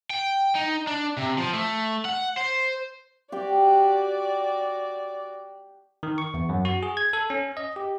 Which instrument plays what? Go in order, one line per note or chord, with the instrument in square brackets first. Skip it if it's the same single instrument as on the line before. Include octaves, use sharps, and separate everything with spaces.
[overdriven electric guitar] G5
D#4
D4
C3
F3
A3
F#5
C5
[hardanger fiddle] F#4 D5 [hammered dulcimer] G4 G5
[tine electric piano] D#3
C#6
E2
F#2
F#4
G#4
G#6
A4
C#4
D#5
G4